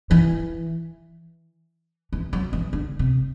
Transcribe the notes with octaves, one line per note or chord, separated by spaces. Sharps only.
E3
E3
F#3
E3
D3
C3